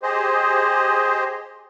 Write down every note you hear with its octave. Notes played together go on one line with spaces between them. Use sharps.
G4 G#4 C5 D#5